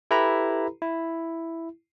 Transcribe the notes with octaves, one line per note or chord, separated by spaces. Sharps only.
E4 G4 A4 B4 A#5 B5
E4